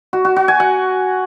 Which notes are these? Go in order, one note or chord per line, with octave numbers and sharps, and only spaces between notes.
F#4
F#4
F#4
G#5
F#5